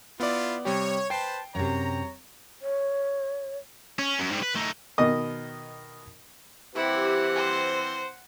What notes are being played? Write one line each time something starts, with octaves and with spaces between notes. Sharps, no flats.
B3 E4 F4 D5
C3 G3 G4 C#5
B4 C5 G5 A5 C7
F#2 C3 C#5 A#5
C#5
C#4
F#2
G#2 G3
B4
A3 D#4
B2 D#3 D#5 D#6
E3 C4 E4 G4 F#5
C5